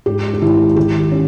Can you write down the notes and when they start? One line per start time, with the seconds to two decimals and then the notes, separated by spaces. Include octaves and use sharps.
0.06 G#2 G4
0.34 G4
0.42 G#1 E4
0.76 D#3 G4
1.12 C#4